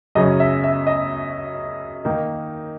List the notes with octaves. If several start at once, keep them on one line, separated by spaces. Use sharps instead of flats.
F#2 C#3 F#3 C#4 D#5
E5
E5
D#5
D#3 A#3 D#4